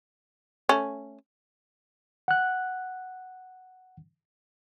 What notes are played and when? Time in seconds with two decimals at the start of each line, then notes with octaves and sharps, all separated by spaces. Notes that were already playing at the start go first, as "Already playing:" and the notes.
0.69 A3 C#4
2.28 F#5 F#6